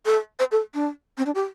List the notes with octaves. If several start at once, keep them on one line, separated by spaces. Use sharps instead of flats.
A4
C5
A4
D4
C4
D4
G4